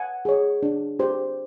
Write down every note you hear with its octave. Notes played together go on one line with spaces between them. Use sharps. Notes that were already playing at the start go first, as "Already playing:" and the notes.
Already playing: F#5 G#5
G#4 C#5
D4
G4 C5